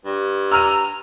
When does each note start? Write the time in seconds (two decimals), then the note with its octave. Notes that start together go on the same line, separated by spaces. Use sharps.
0.05 G2
0.51 A#5 E6 F6 D#7